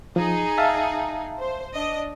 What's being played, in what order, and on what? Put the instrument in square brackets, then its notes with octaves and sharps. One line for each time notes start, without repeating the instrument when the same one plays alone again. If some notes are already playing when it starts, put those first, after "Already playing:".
[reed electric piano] F3 [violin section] D#4 G#4
[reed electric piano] E5 F5 A5
[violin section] C5
D4 D#5